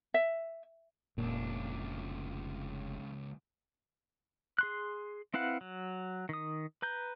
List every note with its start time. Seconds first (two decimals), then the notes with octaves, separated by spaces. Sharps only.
0.14 E5
1.18 F1 C#2 A#2 D4
4.59 G#4 C6 F#6
5.34 C4 E4 B4 F5 F#5
5.61 F#3
6.29 D#3 D#6
6.82 B4 A#5 G6